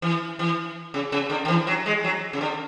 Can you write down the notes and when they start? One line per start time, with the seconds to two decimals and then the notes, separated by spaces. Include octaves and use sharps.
0.02 E3
0.39 E3
0.94 C#3
1.12 C#3
1.30 D3
1.45 D3
1.48 E3
1.67 F#3
1.86 G#3
2.04 F#3
2.33 C#3
2.41 D3